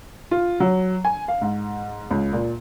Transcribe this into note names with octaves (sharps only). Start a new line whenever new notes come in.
F4
F#3
G#5
F5
G#2
C#2
A#2